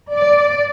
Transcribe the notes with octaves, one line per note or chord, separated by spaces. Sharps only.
D5